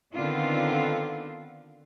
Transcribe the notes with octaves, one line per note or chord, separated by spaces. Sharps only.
D3 D#3 B3 C4 D4 F4